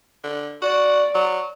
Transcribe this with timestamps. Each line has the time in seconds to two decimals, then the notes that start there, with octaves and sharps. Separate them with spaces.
0.24 D3
0.62 F#4 D5
1.15 F#3